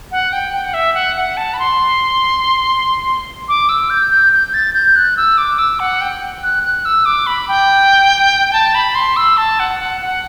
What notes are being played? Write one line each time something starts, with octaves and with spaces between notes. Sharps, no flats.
F#5
G5
G5
F#5
E5
F#5
F#5
A5
B5
C6
D6
E6
G6
G6
G6
A6
G6
F#6
E6
D6
E6
F#5
G5
F#6
F#6
E6
D6
B5
G5
G5
A5
B5
C6
E6
A5
F#5
F#5
F#5